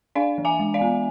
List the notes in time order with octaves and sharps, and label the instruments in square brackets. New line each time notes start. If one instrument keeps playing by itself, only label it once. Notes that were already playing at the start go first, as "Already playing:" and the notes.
[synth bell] D4 D5 F5
E3
E5 G#5
G#3
D5 F5
B3